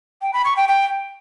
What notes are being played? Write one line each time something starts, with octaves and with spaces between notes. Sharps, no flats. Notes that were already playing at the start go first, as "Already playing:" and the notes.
G5
B5
C#6
G5
G5